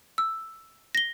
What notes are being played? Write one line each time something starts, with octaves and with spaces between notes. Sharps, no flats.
E6
A#6 G7